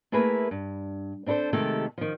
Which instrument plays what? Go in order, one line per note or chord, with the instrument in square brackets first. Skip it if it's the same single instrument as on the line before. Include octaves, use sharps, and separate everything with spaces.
[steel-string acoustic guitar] A3 A#3 E4 G#4 A#4 B4
G2
C4 D4 E4 A4 C5
C3 D#3 G#3 A3 G4 A4
D#3 F3